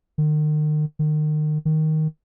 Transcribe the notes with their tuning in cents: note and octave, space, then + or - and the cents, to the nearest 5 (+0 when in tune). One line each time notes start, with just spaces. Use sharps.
D#3 -40
D#3 -35
D#3 +5